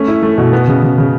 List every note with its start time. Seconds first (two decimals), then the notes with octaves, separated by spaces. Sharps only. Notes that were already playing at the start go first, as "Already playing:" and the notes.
Already playing: A3 C#4
0.08 E4
0.23 A3
0.38 B2
0.53 B3
0.67 C#3
0.83 C#3
0.98 C#3